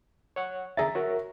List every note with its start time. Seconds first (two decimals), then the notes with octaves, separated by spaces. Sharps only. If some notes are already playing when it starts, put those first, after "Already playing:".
0.36 C#5 F#5
0.77 D3 G#4 E5 A#5 A6
0.95 F#4 A#4 C#5